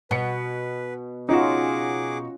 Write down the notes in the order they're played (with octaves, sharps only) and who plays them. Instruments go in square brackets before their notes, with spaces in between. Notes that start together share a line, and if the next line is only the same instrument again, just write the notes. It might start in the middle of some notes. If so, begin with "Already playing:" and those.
[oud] B2 [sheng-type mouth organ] B4 [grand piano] F#5 C#7
[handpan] C#4 F4 [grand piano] D#4 F#4 [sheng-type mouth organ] G#4 F#5 D6